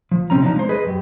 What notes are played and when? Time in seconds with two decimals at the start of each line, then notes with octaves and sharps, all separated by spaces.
0.11 F3
0.30 C3 F3 C4 C#4 A#5
0.42 F3 B3 D4 D#4
0.56 G#3 C5
0.69 G#4 B4 D#5
0.86 F#2 G4